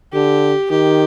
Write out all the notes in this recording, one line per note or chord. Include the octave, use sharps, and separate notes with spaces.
D3 G4
D#3 G4